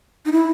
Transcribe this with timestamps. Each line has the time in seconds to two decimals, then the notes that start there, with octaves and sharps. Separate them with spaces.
0.26 D#4
0.32 E4